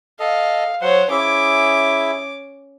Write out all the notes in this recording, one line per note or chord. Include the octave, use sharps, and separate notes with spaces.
A4 D#5 F5
F#3 C5 C#5 F#5
C#4 E4 G#4 E5 D6